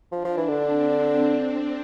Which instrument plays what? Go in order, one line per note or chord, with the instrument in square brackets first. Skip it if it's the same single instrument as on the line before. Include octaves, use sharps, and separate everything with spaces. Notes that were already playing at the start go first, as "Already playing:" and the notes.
[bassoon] F3 [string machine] D4
[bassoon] F3
E3
D3
[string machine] C4